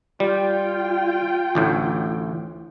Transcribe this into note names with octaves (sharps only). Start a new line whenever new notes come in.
G3 F4 G5
A1 D2 A2